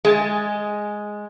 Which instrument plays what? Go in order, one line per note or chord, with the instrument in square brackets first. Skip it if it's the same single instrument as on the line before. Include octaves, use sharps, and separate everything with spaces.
[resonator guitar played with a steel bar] G#3 [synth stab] G#4 G#5 A6